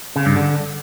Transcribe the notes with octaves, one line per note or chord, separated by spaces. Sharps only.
C#3
G2
D3